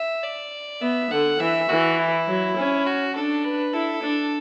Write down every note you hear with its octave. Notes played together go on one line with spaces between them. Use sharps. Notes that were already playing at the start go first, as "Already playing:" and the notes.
Already playing: E5
D5
B3 E5
D3 F#5
E3 E5
E3 F#4
E4
F#3
C#4
F#4
D4 A4
B4
E4 A4
D4